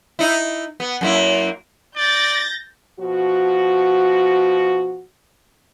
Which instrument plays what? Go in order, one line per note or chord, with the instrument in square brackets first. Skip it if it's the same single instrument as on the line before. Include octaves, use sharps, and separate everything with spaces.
[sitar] D#4 E4
B3
F#2 A#3 E4
[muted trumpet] D5 [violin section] G6 A6 A#6
[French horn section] B2 F3 F#4